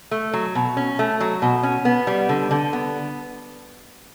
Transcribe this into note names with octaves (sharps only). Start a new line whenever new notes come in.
A3
F#3
B2
C#4
A3
F#3
B2
C#4
B3
G3
D3
D3
B3